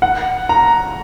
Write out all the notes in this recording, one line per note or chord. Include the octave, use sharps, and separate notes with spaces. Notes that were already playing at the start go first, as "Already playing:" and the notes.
F#5
A#5